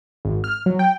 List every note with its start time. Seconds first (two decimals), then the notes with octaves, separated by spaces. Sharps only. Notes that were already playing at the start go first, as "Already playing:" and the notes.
0.25 G#1
0.44 F6
0.66 F#3
0.79 G5